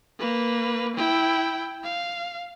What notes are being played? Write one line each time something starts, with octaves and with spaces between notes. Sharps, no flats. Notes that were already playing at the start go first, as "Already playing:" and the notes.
A#3 B4
E4 G5
F5